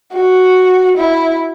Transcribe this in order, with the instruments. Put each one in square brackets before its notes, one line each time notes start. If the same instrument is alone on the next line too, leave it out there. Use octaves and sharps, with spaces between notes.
[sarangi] F#4
E4